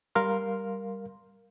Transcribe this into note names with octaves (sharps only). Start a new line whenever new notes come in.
G3 A#4 F5 C6